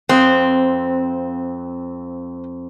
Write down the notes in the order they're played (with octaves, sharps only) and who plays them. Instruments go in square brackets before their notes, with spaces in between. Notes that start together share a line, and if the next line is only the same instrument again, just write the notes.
[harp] F2 D#6 F#6 [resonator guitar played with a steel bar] C4